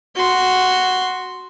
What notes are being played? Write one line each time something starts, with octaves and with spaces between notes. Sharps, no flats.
F#4 C6